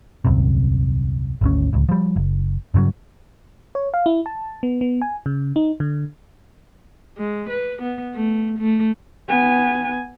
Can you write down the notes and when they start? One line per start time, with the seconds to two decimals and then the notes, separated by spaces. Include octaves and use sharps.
0.25 D#1 C2 F#2 C3
1.41 G#1 D2 C#4
1.73 D1 C#2
1.89 F3 G3
2.16 F#1
2.74 G2 C#3 E3 F#3
3.75 C#5
3.94 F5
4.06 E4
4.26 A5
4.63 B3
4.81 B3
5.02 G#5
5.26 C#3
5.56 D#4
5.80 D3
7.17 G#3
7.50 B4
7.82 B3
8.15 A3
8.59 A3
9.28 B3 G#5